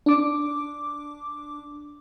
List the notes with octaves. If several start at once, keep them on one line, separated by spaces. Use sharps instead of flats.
D4 D6